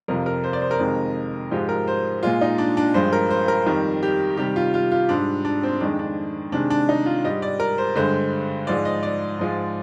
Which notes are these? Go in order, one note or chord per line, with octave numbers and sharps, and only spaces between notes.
F2 C3 F3 A#4
A#4
C5
D5
C5
A#4
F2 C3 D#3 G#3
G#2 F3 G#3 G4
A#4
C5
A#2 G#3 F4
D#4
D4
D4
G2 F3 G#3 C5
A#4
C5
A#4
F2 D#3 G3
G4
C3 D#3 G3 G4
F4
F4
F4
G#2 G3 D4
D4
C4
F2 D#3 G#3 D4
D4
C3 D#3 G#3 D4
D4
D#4
F4
G#2 G3 D#5
D5
A#4
C5
G2 D3 G#3 C5
G#2 F3 G#3 D5
D#5
D5
G#2 F3 G#3